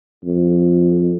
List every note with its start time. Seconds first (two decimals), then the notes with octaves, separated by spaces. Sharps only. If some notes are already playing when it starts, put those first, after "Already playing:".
0.24 F2